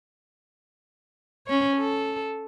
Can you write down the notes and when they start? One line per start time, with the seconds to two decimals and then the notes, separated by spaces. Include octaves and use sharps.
1.46 C#4 C#5
1.77 A4